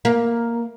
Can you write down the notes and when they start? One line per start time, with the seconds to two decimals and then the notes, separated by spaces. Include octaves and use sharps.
0.05 A#3